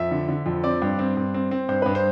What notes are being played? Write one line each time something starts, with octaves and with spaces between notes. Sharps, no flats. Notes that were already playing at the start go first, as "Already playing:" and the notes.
Already playing: F2 E5
D3
D3
F2
C4 D5
G2
C4
G2
C4
C4
G2 C5
G2 B4
C5